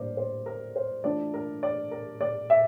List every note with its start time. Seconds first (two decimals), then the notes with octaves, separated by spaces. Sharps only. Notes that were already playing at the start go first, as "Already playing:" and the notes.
Already playing: A2 G3 A#3 D4 A#4 C5 D5
0.17 C5
0.46 A#4
0.76 C5
1.04 E3 A3 D4 F4 D5
1.34 A#4
1.63 D5
1.91 A#4
2.21 D5
2.50 E5